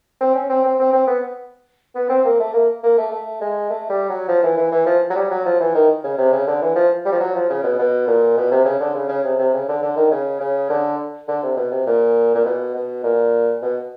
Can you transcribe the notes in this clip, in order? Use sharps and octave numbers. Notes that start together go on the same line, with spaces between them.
C4
C#4
C4
C4
C4
C4
B3
B3
C4
A#3
A3
A#3
A#3
A3
A3
G#3
A3
G3
F#3
F3
E3
E3
E3
F3
F#3
G3
F#3
F3
E3
D#3
C#3
C3
C#3
D3
E3
F3
G3
F3
F#3
F3
C#3
B2
B2
A#2
B2
C3
C#3
D3
C#3
C#3
C3
C3
C#3
D3
D3
D#3
C#3
C#3
D3
D3
C3
B2
C3
A#2
A#2
B2
B2
A#2
B2